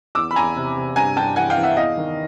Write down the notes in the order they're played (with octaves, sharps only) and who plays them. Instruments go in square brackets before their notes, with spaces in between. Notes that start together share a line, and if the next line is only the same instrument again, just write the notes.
[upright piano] E2 D6 E6
B5
E2 G#5 A#5
C3
C3
G2 G#5 A#5
G2 G5 A5
E3 F#5 G#5
F5 G5
E3
E5 F#5
E2 D#5 F5
D#3